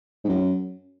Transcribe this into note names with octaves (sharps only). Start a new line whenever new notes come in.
G#2
F#2